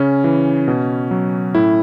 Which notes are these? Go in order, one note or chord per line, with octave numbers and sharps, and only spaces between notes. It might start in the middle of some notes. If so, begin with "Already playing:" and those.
Already playing: C#3 C#4
E3
B2
F#3
A2 E4